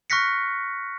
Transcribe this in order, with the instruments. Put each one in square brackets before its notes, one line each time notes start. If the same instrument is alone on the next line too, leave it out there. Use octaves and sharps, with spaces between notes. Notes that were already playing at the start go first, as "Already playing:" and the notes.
[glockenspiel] C#6 F6 F#6 A#6 B6 C#7